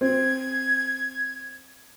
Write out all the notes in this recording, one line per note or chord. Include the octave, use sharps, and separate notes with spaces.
C4 G#6